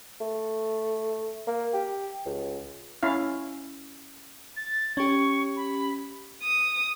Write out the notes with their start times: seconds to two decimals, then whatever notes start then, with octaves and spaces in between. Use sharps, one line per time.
0.21 A3
1.47 A#3
1.74 G4
2.26 C#2
3.03 C#4 E4 F5
4.56 A6
4.97 C#4 G4 C#6
5.56 B5
6.43 D#6